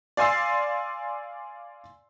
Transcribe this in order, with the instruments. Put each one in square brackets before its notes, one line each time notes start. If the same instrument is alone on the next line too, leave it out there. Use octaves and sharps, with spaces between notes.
[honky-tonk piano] D5 F5 G#5 C6 E6 C7